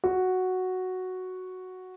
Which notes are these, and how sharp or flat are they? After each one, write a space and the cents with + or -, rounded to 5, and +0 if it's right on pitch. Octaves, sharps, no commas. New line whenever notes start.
F#4 +0